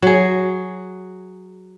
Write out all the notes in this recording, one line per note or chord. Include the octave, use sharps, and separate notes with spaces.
F#3 G#4